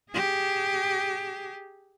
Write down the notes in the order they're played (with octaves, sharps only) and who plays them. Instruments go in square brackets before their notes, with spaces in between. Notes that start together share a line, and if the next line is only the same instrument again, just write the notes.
[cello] G4 G#4